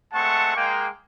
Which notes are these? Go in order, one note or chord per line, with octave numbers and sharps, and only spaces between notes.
G#3 A3 C4 F#5 A5 C#6
G#3 A#3 G5